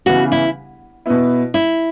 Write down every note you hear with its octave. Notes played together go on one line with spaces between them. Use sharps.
C#3 E3 B3 F#4
E4
B2 B3 E4
E4